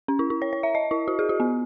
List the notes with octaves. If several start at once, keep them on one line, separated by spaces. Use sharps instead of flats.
C#4
E4
E4
C#5
C#5
E5
D#5
E4
F#4
G#4
F#4
B3